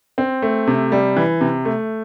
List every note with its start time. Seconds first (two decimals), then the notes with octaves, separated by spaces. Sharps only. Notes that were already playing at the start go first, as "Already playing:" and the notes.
0.18 C4
0.42 A3
0.67 C3
0.92 G3
1.16 E3
1.41 C3
1.65 A3